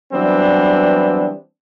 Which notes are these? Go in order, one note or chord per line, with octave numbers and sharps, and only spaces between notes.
E3 F#3 G3 B3 C4 D4